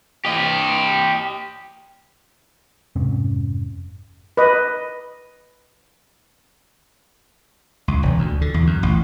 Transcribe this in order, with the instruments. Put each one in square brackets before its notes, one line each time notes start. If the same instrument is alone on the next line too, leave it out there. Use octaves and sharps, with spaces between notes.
[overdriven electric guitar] G4 D#5
[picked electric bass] F1 G#2 C3 C#4
[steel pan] B4 D#5
[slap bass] C#2
E1
D2
D3
E2
F#2
A1